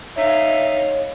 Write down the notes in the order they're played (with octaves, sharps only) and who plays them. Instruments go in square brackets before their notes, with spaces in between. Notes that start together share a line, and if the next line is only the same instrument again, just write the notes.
[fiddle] D#4 F5 [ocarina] C#5 [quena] E5